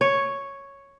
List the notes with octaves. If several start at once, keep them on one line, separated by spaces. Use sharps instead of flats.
C#5